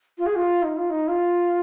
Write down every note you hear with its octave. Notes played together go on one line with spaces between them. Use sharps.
F4
G#4
F4
D#4
F4
D#4
F4